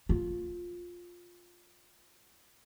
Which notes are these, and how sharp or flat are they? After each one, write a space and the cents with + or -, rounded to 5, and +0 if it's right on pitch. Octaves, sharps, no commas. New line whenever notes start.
F4 +10